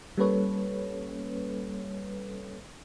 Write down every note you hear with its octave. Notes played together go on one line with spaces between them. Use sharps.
G3 A#3 C#4 A4 B4 C#5